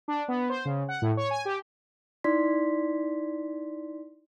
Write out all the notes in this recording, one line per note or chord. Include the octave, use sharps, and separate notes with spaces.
D4
B3
C5
C#3
F#5
A2
C#5
G#5
G4
D#4 E4 D5 C6 B6